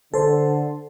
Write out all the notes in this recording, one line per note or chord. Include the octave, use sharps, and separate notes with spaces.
D3 A4 C5